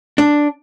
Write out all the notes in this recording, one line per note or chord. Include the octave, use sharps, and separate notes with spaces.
D4